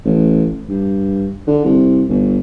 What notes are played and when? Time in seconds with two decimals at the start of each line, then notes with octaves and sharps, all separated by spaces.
0.05 A1
0.69 G2
1.47 D3
1.64 C2
2.09 G1